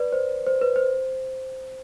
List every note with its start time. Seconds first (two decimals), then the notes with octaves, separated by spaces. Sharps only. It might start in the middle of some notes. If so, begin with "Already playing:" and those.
Already playing: B4 D5
0.12 C5
0.46 C5
0.61 B4
0.76 C5